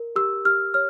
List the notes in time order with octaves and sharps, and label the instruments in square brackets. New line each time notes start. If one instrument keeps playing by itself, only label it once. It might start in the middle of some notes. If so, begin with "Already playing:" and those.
Already playing: [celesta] A#4
G4 E6
G4 F6
C#5 F6